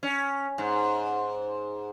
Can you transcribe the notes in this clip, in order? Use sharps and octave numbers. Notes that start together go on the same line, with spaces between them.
C#4
G#2